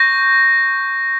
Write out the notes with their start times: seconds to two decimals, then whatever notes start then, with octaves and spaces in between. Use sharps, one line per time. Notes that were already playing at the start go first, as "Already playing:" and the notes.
Already playing: C#6 G6 A#6